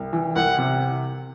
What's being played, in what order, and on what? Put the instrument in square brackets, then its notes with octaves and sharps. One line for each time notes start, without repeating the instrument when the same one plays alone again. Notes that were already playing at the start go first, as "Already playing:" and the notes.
Already playing: [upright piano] C2
E3
[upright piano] C2 [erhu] F#5
[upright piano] C3